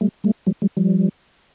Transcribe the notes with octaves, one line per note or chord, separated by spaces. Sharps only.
G3 A3
G3 A3
F3 G3
F#3 G#3
F3 G3